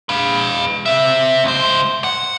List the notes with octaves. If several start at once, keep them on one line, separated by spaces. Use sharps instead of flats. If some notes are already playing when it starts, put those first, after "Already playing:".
B4 F5
C4 E5
C#2 C5
F#5